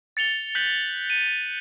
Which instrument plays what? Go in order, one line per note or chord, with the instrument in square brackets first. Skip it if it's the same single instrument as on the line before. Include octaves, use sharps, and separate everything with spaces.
[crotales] A6 C#7 F7 G7
F#6 G6 B6 F#7
C#7 D#7